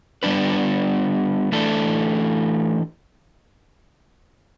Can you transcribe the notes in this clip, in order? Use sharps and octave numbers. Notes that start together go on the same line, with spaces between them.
G3 B3 D4 B4
E3 A3 D4 A4